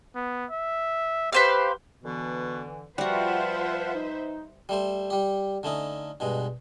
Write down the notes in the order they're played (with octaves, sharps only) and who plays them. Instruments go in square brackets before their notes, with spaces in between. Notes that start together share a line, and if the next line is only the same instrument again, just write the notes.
[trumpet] B3
E5
[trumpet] G4 [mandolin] B4 C5 F5
[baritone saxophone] B2 [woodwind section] D3 E3
[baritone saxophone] F3 [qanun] G3 F#4 [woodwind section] F4 F#5 [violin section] B4 C5 E5
[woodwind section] D#4
[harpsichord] G3 A3 C5
G3 G4
D3 A3 C#4 D#4
G2 B2 G#3